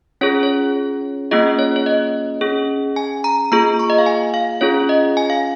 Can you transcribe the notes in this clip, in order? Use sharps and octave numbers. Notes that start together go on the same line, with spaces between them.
C#4 F4 G#4 C#5
C#5
A#3 C#4 F4 G#4 D#5
C#5
C#5
D#5
C#4 G#4
G#5
A#5
A#3 F4 G#4 A#5
C#6
D#5
F5
G#5
F5
C#4 F4 G#4 C#5
D#5
G#5
F5